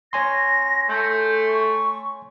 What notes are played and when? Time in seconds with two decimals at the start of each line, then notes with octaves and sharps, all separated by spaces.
0.13 C#5 G#5 C6 A#6
0.89 A3 G6
1.48 C#6